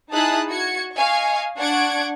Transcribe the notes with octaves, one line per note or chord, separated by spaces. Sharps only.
D#4 E4 G#4 A5 D#6 F#6
F#4 G#6 C#7
D#5 F5 G#5 C#6
D4 F#5 C#6 G#6 D7